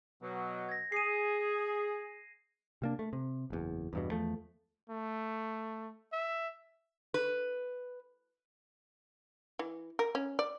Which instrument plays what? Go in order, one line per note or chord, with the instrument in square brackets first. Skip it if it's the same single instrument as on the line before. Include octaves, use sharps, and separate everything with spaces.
[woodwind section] B2 F#3
[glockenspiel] G#6 A#6
[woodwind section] G#4 [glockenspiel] C7 D#7
[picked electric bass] C3 A#3 D4
A3
C3
F#1 E2
E2 G2 B2
E2 F3 A3
[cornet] A3
E5
[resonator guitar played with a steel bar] B4
[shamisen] E3
A#4
C#4
D5